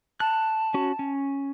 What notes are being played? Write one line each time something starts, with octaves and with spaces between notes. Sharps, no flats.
A5 F#6
C#4 F#4
C#4